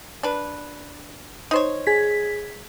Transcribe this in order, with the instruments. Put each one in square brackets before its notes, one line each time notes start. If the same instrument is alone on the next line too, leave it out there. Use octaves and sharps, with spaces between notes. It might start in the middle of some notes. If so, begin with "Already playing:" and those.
[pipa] D4 B4
D#4 C5 C#5
[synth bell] G#4 B6